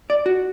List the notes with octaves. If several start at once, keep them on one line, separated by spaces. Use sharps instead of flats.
D5
F#4